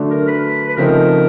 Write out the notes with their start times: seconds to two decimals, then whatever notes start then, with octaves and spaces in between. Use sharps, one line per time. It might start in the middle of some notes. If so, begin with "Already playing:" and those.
Already playing: D3 F#3 A3 D4
0.10 A#4
0.27 B4
0.68 B4
0.76 C#3 F3 A3 C4 D#4 A#4